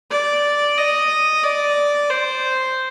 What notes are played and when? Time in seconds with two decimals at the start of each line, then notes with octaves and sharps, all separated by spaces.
0.11 D5
0.77 D#5
1.43 D5
2.10 C5